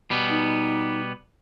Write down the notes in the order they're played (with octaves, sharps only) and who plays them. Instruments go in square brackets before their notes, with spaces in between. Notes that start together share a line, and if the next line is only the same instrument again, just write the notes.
[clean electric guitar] B2 G3 B3
[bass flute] D#4